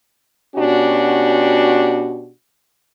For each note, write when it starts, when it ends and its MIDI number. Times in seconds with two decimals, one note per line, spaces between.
0.56 2.30 47
0.56 2.30 61
0.56 2.30 62
0.56 2.30 66
0.56 2.30 67